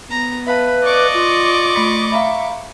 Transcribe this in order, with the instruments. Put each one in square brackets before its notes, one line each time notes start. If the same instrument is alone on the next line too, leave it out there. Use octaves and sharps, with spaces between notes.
[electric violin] B3 [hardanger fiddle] A#5
[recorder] B4 [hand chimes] E5 F5 A5 [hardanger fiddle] B5
[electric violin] D5 D#5 [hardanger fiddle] C#6 D6
[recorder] F4 [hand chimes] D7
[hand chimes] A3 B5 B6
[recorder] E5 [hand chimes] F5 A#5 B5